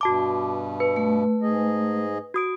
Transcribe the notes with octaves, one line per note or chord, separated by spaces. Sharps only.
G2 B2 F#4 A5 D6
B4
A3
G#2 G#4 D#5
F#4 D#6 D7